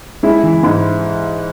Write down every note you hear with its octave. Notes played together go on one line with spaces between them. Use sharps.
G#3 E4
E3
G#2